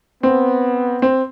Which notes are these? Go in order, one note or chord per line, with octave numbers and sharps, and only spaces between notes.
B3 C4
C4